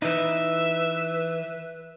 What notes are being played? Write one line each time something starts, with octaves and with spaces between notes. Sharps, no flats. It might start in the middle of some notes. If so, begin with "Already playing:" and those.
E3 D#4 B4 E5